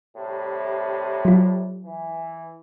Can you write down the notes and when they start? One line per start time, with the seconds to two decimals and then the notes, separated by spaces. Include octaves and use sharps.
0.17 A2 C3 G3
1.25 F#3 F4
1.85 E3